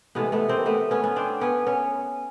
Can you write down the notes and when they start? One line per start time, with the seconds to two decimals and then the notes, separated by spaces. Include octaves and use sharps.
0.15 C3 E3 G#3 A3 B3
0.32 A3 B3
0.49 A#3 C4
0.66 A3 B3
0.91 B3 C#4
1.04 B3 C#4
1.16 C4 D4
1.41 B3 C#4
1.67 B3 C#4